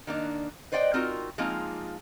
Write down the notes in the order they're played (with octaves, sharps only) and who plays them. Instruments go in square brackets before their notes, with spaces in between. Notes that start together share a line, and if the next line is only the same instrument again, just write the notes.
[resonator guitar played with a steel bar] D#3 A#3 D4
B4 C5 D5 D#5 F#5 G5
C4 D#4 F4 F#4 A#4
F3 G#3 A#3 C4 D#4 F4